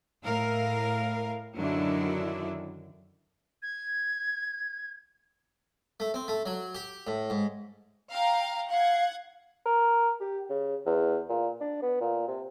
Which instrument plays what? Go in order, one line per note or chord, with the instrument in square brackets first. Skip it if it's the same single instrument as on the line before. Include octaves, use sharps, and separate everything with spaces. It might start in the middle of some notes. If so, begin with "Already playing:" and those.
[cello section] A2 A#4 F5
F#2 D3 D#3 F#3 D4 E4
[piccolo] G#6
[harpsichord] A3
C4
A3
F#3
G4
A2
G#2
[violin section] F5 G5 A#5
[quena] F5 [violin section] F#5 G#6
[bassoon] A#4
G4
C#3
E2
A#2
D4
B3
A#2
C3